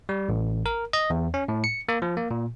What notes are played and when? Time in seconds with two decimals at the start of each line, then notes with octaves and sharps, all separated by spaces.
0.09 G3
0.29 A1
0.66 A#4
0.93 D#5
1.10 E2
1.34 C#4
1.48 A2
1.64 C#7
1.89 A#3
2.02 F3
2.17 A#3
2.31 A#2